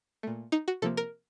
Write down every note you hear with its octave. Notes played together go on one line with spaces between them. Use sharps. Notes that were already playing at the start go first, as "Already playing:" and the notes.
A#2 A3
D#4
F#4
C3 F3 A#3 A4
A#4